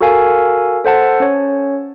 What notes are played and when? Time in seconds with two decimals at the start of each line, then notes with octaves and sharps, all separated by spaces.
0.01 F#4 A4 A#4 F5 G#5
0.85 A4 C5 F#5 A5
1.20 C#4 C#5